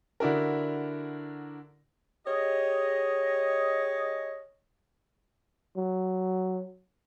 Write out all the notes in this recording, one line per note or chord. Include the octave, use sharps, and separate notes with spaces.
D3 D4 E4 F#4 A#4
G4 G#4 C#5 D#5
F#3